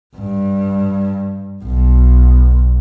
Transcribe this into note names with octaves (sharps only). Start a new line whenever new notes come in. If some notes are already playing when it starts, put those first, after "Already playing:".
G2
B1